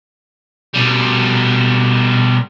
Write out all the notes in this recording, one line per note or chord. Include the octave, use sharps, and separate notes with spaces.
B2 G3